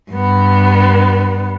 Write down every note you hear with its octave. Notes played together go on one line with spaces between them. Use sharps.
G2 B3